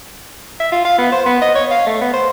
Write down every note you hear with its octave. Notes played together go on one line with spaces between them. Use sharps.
E5
F4
F5
B3
C5
B3
D#5
C#5
F5
A3
B3
C5